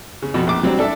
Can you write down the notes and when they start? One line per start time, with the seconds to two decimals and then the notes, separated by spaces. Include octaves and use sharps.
0.22 C#3
0.34 F2 B2
0.47 A#1 D6
0.63 F#3 G3 C4 D4
0.79 D4 A4 D5 E5